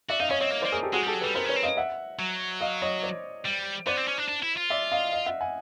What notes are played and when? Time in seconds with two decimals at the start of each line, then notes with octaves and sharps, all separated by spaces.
0.10 F#4 D5 E5
0.20 D#4 D#5 F5
0.30 C#4 C#5 D#5
0.41 C4 C#5 D#5
0.51 A#3
0.61 C5 D5
0.66 A#3
0.72 G#4 A#4
0.83 G4 A4
0.93 G#3 F#4 G#4
1.03 G3 G4 A4
1.14 F#3
1.21 G3 A4 B4
1.35 B3 A#4 C5
1.46 C#4 B4 C#5
1.56 C4
1.63 D#5 F5
1.77 E5 F#5
2.19 F#3
2.61 D#5 F5
2.82 C#5 D#5
3.02 C5 D5
3.45 G3
3.87 B3 C5 D5
3.97 C4
4.08 C#4
4.18 D4
4.28 D4
4.42 E4
4.56 F4
4.70 D5 E5
4.92 D#5 F5
5.13 D#5 F5
5.26 E5 F#5
5.41 F#5 G#5